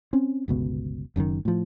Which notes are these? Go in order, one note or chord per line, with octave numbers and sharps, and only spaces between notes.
C4 C#4
G1 C#2 B2
F#1 F#2 B2 D#3
A2 F3